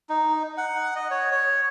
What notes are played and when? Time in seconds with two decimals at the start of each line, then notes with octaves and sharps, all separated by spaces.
0.09 D#4
0.57 F#5
0.96 D#5
1.11 C#5
1.31 C#5